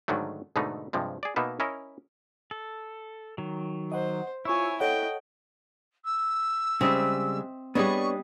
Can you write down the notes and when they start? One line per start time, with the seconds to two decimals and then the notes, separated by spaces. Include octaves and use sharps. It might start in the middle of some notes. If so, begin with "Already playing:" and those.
0.08 G#2 D3 D#3 F#3 A3
0.56 G#2 B2 D3 A3 B3 D#4
0.93 G2 C3 F3 G#3
1.23 G#4 D5
1.36 B2 A#3 B3 D#4 E5
1.60 C#4 E4 A#4 D#5
2.51 A4
3.38 D#3 F#3
3.92 C5 D#5 F#5
4.45 E4 F4 C#5 G#5 C#6 E6
4.80 A4 C#5 D#5 F#5 G5
6.05 E6
6.81 C#3 G3 G#3 C4 D#5 E5
7.75 G3 B3 D4 G#4 C#5 D#5 C#6